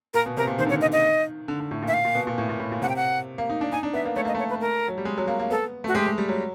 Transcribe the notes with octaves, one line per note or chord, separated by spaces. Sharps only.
A#2 A#4
B2
C3 A#4
A#2
D#3 C5
D3
C#5
D#3
D#5
D#5
D3
D3
A2
A#2
E5
F5
A#2
B2
A#2
A2
A#2
A2
A#2
C3 F#5
G5
F#5
A#3
D#4
D4
D#4 G#5
D4
B3 E5
A#3
A3 C#5
A#3 D#5
A3 C#5
B4
A#4
F#3
G3
G#3
F#3
A#3
A#3
B3 A4
A3
F#4
G#3 G4
G#3
G3
F#3